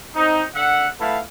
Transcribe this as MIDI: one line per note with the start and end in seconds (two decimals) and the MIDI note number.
0.15 0.44 60
0.15 0.44 63
0.55 0.86 50
0.55 0.86 76
0.55 0.86 78
1.00 1.19 57
1.00 1.19 59
1.00 1.19 64
1.00 1.19 77
1.00 1.19 81